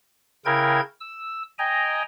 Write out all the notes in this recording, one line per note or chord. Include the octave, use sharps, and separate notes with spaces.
C#3 E4 A#4 G5 G#6
E6
D#5 G5 G#5 A#5